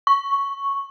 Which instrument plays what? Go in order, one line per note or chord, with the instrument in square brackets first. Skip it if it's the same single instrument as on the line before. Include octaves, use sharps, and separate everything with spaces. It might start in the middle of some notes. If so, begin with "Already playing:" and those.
[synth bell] C#6